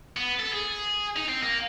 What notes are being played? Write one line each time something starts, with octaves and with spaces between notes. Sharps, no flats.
B3
A4
G#4
D#4
C4
A#3